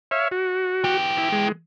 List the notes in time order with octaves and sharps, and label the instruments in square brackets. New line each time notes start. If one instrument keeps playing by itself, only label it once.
[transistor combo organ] C#5 E5 F5
F#4
[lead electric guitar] E3 G4
[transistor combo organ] E4
G#3